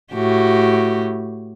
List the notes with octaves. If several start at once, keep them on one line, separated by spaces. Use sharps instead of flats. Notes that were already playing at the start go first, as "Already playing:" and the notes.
A2 F#4 G4